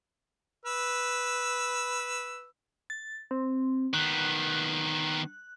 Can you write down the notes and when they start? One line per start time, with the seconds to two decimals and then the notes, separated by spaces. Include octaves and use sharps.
0.65 B4 E6
2.90 A6
3.31 C4
3.94 D#3 B3 F#6